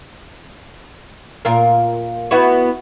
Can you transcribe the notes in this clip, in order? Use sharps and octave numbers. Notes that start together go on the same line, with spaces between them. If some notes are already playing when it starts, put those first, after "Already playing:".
A#2 F4 A#4
B3 E4 F#4